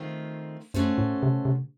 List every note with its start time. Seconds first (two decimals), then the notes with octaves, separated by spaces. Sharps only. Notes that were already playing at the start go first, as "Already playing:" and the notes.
Already playing: D#3 A3 C4 F4
0.74 F#2 A3 C#4 F#4 A4 C5
0.98 A2
1.23 C3
1.45 C3